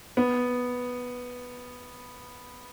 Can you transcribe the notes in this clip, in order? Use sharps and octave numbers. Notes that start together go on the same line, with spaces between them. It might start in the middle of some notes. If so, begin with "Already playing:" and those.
B3